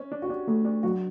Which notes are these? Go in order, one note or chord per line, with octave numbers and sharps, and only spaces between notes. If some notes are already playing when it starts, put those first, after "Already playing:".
Already playing: C#4
D4
F#4
D4 G4
A3
D4
F#3 F#4